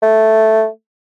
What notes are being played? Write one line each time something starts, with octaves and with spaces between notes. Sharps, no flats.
A3